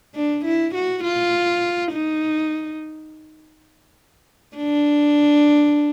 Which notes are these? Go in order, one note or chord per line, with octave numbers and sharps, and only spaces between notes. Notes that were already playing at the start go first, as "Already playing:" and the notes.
D4
E4
F#4
F4
D#4
D4